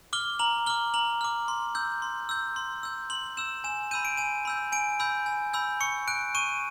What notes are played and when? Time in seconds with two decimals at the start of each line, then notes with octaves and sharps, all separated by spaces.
0.13 D6 F6 G7
0.39 A#5 F#7
0.66 D6 F6 G7
0.94 A#5 F#7
1.21 D6 F6
1.48 C6
1.75 E6 G6
2.02 C6
2.29 E6 G6
2.56 C6
2.83 E6 G6
3.10 C6 F#7
3.37 E6 G6 E7
3.64 G#5 E7
3.91 B5 E6 G6 D#7
4.05 D7
4.17 G#5 D#7
4.45 B5 E6 G6
4.72 G#5 D7
5.00 B5 E6 G6
5.26 G#5
5.53 B5 E6 G6
5.80 C#6 C#7
6.08 F#6 D7
6.35 C#6 D#7